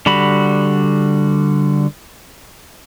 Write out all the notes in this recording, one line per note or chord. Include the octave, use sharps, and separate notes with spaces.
D3 G3 F#4 B5